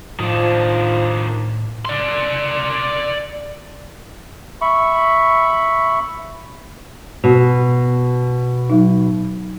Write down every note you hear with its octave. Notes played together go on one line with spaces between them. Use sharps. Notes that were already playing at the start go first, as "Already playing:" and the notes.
A2 D#3 F3 D4
D5 C6
E5 B5 C#6
B2 F#4
F#3 D#4